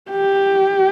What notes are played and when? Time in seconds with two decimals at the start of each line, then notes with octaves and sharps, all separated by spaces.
0.10 G4